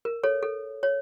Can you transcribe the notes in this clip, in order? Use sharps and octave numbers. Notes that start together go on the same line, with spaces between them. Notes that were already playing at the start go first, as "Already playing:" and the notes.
A#4
A4 C#5
A4
C#5